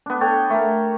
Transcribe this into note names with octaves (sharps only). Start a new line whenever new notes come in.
B3 D4
A4 C#5 G5
A3 A#4